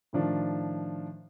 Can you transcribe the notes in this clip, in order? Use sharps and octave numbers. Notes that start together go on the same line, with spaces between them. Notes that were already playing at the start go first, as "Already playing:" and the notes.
A2 D#3 F3 D4